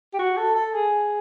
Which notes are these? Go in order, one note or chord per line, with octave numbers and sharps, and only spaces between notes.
G4
F#4
A4
A4
G#4